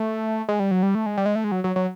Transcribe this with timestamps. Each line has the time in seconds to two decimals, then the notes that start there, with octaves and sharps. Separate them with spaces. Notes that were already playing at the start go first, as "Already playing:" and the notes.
Already playing: A3
0.49 G#3
0.60 G3
0.71 F#3
0.83 G3
0.95 A3
1.06 G#3
1.17 G3
1.26 G#3
1.35 A3
1.44 G#3
1.52 F#3
1.64 F#3
1.76 F#3